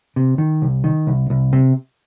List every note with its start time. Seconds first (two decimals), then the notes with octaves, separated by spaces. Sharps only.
0.16 C3
0.38 D#3
0.62 C2
0.84 D#3
1.07 C2
1.30 C2
1.53 C3